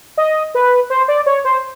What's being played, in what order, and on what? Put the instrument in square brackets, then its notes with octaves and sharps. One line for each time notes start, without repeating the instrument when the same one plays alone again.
[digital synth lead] D#5
B4
C5
D5
C#5
C5